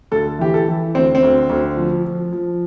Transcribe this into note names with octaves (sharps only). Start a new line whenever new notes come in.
D2 A4
E3 G4
A4
E3
D2 C4
C4
D2
D2
F3
F3
F3